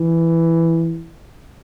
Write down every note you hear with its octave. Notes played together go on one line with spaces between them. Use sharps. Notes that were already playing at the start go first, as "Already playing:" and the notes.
Already playing: E3